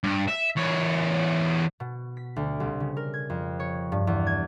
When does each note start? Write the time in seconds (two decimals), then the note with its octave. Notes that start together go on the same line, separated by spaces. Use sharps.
0.04 G2
0.28 E5
0.56 E2 C#5
1.80 B2
2.17 B6
2.36 D2
2.60 C2
2.80 C#3
2.97 A#4
3.14 G#6
3.30 F2
3.60 C#5
3.92 G2
4.07 E2
4.27 G#6